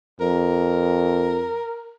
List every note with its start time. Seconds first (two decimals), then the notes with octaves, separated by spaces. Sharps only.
0.20 F2 A#4